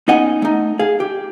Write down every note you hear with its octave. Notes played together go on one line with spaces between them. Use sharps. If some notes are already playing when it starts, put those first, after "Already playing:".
B3 C#4 D#4 D#5 F#5 G#5
A3 D#4
G#4 F5
G4